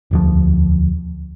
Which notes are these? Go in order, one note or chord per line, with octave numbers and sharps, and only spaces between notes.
E1 D2 F3